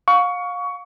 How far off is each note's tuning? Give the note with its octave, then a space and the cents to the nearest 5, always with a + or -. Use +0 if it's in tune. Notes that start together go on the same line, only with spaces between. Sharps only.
F5 +35 C#6 +20